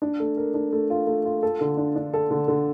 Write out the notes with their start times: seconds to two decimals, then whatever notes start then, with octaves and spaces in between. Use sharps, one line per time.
0.02 D4
0.20 A3
0.37 A#4
0.54 D4
0.72 A3
0.90 F4
1.07 A3
1.25 F4
1.43 A4
1.61 D3
1.77 D4
1.96 D4
2.14 A4
2.31 D3
2.48 D3